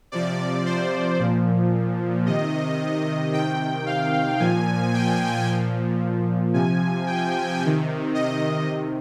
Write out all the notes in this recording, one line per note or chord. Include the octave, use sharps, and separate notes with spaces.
C3 F3 D5
C5
A#2 F3
C3 D#3 D#5
C3 D#3 G5
F5
A#2 F3 G#5
G5
A#2 F3
C3 F3 G#5
G5
C3
D#3
D#5
C3 D#3